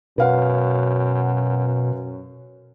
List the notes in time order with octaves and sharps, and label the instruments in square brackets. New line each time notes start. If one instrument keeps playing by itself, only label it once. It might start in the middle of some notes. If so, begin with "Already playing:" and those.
[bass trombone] F#2 [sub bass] B2 [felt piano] B4 F5 F#5